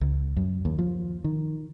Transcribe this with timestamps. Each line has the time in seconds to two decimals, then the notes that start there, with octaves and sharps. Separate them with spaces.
0.01 C#2
0.37 F#2
0.65 D#2
0.79 F3
1.24 D#3